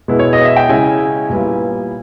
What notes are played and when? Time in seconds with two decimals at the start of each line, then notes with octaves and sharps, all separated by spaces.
0.08 B2 G#3 B3 E4
0.19 C#5
0.33 D#5
0.45 E5
0.56 G5
0.69 C#3 G#3 C#4 E4 G#5
1.30 A#2 G3 B3 E4